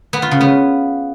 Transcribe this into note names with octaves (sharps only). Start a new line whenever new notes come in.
B3
F4
C#3
B3